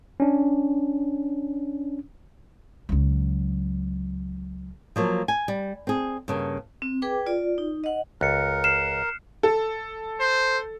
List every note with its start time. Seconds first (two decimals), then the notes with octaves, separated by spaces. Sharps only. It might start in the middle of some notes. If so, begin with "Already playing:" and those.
0.20 C#4 D4
2.89 C#2 F#3
4.96 F3 F#3 A#3
5.28 G#5
5.48 G3
5.87 C4 G#4
6.28 G2 C#3 A#3
6.82 C4
7.02 G#4 B4 G5 D6
7.26 F4 D5
7.58 D#4
7.84 D#5 F#5
8.21 C#2 A#4 F#6 C#7
8.64 F6 C7 E7
9.43 A4
10.20 C5